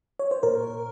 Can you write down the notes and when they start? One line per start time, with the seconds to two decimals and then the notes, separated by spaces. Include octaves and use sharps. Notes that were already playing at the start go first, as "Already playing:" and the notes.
0.19 C#5
0.31 C5
0.43 A#2 A#4